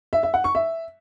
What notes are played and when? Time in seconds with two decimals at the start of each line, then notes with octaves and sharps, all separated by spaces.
0.13 E5
0.23 E5
0.34 F#5
0.44 C#6
0.55 E5